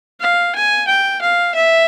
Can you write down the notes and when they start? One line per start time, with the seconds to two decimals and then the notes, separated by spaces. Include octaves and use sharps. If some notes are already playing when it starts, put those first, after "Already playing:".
0.21 F5
0.55 G#5
0.88 G5
1.21 F5
1.55 E5